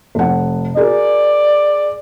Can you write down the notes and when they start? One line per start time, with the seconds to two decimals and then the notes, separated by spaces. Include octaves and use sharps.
0.15 F1 F#5
0.76 F#4 G#4 A#4 D5